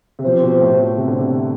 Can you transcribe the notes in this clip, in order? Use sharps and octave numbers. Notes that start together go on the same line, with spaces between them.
C3
B2 F3 C4 G4 C5
B2
A2
B2
C3
D3
C3